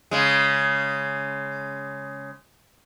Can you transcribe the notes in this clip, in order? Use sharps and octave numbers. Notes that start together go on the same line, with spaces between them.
C#3 G#3